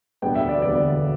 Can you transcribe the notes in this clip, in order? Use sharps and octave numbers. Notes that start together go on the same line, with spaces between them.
E1 D2 D3 G3 B3 G5
E5
D5
E1 D2 D3 G3 B3 D5